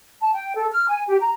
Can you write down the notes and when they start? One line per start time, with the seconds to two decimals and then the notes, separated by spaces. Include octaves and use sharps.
0.21 A5
0.35 G5
0.56 A4
0.71 F6
0.87 G#5
1.09 G4
1.21 A#5